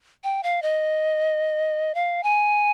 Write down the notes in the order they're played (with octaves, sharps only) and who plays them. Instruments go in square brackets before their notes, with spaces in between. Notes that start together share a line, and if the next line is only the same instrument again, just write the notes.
[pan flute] G5
F5
D#5
F5
G#5